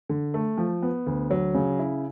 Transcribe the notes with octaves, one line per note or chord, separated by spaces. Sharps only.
D3
A3
F3
B3
D2
F#3
C#3
E4